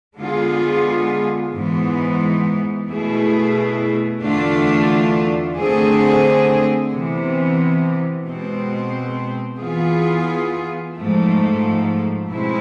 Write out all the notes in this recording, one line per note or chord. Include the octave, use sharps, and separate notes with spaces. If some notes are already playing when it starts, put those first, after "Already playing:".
D3 G#3 B3 F4 G#4
G#2 E3 G#3 B3
B2 A3 E4 G#4
E2 D3 A3 D4 F4
D3 A3 C4 G#4
C3 E3 B3
B2 G#3 C4
E3 B3 F4 G#4
G#2 F3 A3
B2 G#3 C4 E4